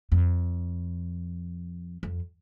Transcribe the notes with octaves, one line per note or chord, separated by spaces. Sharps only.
F2
F2